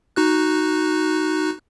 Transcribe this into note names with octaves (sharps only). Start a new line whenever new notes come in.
D#4 F#4 F#6